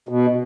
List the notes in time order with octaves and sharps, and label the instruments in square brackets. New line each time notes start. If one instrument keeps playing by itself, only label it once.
[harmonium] B2